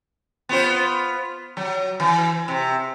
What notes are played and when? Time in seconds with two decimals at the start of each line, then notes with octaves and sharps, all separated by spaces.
0.49 B3 F4 C5
1.57 F#3
2.00 E3
2.48 C3